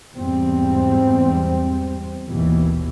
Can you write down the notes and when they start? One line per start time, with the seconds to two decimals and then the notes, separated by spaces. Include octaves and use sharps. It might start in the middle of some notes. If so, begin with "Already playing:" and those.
0.14 E2 G#2 G3 C4
2.28 G#1 D#2 B2 E3